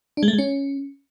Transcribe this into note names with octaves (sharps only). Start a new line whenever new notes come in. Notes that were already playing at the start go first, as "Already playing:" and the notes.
D4
G#3
A3
G#3
C#4